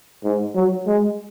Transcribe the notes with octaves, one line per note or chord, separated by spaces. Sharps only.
G#2
F#3
G#3